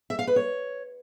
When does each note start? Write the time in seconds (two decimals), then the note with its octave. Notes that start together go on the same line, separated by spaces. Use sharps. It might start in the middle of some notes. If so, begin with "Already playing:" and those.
0.10 E5
0.19 F5
0.27 B4
0.36 C#5